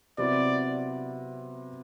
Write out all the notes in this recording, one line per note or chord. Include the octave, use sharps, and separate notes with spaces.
C3 F#3 B3 E4 D5